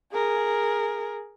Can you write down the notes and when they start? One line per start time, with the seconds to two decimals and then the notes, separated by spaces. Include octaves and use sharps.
0.12 G#4 A#4